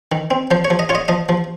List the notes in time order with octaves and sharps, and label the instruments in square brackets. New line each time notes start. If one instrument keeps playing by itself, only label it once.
[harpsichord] D#3
C4
F3 C5
C#5
F3
D#5
F4 C#5
D#5
F3 D#5
F3